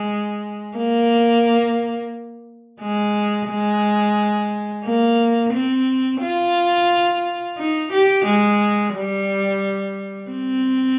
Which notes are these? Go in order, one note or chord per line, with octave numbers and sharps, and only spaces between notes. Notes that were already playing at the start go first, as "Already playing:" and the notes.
Already playing: G#3
A#3
G#3
G#3
A#3
C4
F4
D#4
G4
G#3
G3
C4